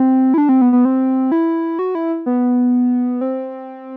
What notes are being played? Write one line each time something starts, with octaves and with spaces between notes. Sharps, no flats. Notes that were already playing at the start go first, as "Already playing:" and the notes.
Already playing: C4
E4
D4
C4
B3
B3
C4
E4
F#4
E4
B3
C4